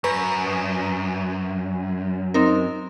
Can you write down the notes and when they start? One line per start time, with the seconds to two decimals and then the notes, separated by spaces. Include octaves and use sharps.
0.04 F#2 B4 A#5 C#6
2.34 C4 D#4 A#4